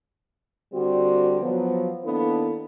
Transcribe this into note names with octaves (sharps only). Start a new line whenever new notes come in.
D3 G3 C4 F#4
F3 F#3 B3
D#3 A#3 B3 D4 E4 A4